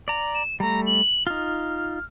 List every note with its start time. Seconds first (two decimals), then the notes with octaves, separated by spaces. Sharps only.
0.08 D5 A#5
0.35 E7
0.60 G3 A3 A#5
0.86 F#7
1.27 D#4 F4 F6